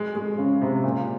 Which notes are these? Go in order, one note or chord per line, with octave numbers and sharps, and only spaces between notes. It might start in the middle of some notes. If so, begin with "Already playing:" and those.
Already playing: G#3
G#3
C#3
C3
A#2